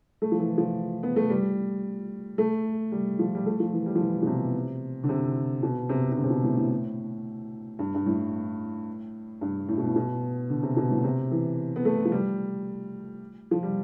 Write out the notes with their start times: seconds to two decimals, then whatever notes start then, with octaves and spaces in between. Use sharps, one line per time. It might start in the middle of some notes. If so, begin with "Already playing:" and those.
0.22 A3
0.32 F3
0.40 E3
0.58 F3
1.03 B3
1.16 A3
1.30 G3
2.38 A3
2.92 G3
3.19 F3
3.35 G3
3.46 A3
3.60 F3
3.73 E3
3.86 G3
3.96 F3
4.01 E3
4.22 B2
4.27 C3
5.04 D3
5.09 C3
5.63 B2
5.89 C3
6.12 C3
6.17 D3
6.24 C3
6.30 B2
6.43 A2
6.57 A2
7.79 G2
7.94 G2
8.06 A2
9.41 G2
9.69 A2
9.78 B2
9.87 A2
9.96 B2
10.50 D3
10.63 C3
10.77 B2
10.91 A2
11.04 C3
11.31 E3
11.76 B3
11.85 A3
12.05 F3
12.12 G3
13.51 F3
13.63 G3